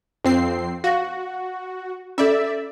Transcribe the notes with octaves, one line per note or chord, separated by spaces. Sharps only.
F2 C4 C7
F#4 F5 A#6
C#4 A4 D5 E5